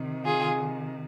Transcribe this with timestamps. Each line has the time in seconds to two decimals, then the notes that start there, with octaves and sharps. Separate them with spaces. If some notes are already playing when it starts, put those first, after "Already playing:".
Already playing: C3 D#3
0.24 F4 G#4